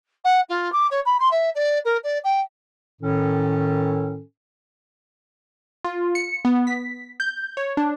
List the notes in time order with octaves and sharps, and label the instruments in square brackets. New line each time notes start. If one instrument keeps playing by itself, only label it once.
[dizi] F#5
F4
D6
C#5
B5
C6
E5
D5
A#4
D5
G5
[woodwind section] A2 D#3 C#4 A4
[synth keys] F4
C#7
B3
B6
G6
C#5
D4